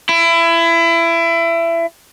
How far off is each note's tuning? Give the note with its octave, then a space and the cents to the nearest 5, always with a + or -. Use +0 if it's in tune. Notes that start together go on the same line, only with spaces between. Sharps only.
E4 +25